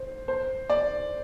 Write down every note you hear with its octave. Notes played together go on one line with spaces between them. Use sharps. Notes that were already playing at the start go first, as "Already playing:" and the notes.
Already playing: C5
C5
D5